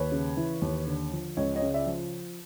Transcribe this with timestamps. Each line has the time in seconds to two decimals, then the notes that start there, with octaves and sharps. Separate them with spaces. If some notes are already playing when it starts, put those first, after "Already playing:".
Already playing: D#2 B4 C#5
0.12 C#3
0.37 E3
0.62 D#2
0.87 D3
1.13 F3
1.37 C#2 C#5 D#5
1.56 C#5 D#5
1.62 C#3
1.74 D5 E5
1.86 F3